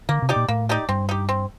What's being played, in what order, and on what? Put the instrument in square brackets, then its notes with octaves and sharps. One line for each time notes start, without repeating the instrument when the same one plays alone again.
[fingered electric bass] D3 [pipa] A#3
[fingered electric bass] C3
[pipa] D#4 G4 D5
[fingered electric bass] A#2
[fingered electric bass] A2 [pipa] A#3
[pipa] D#4 G4 D5
[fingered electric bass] G2 [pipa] C4
[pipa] D#4 G4
C4